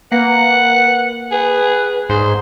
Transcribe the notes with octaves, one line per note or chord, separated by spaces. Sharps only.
A#3 B4 F#5
G#4 B4
G#2 G#4 C5